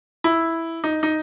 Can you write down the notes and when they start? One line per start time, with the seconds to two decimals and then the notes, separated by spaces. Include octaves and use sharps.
0.24 E4
0.84 D#4
1.03 D#4